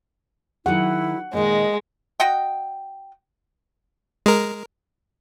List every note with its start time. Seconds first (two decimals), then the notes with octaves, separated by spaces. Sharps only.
0.66 D#3 F#3 E4 G#4 F#5
1.33 A#2 D#3 G#3 D#5
2.20 F#4 D#5 F#5 G5
4.26 G#3 A#4